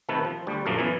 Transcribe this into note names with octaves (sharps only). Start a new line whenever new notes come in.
C3 D#3 A3 A4 B4
F3
D2 G3
A#1 F#2 F3 A3 A#3
F#2 B2 E3 G#5